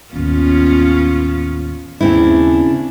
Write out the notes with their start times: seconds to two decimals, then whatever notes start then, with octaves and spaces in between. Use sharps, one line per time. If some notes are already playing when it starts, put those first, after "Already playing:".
0.13 A1 D#2 B3 C#4 F4
2.01 D#2 C#3 A#3 C4 D4 E4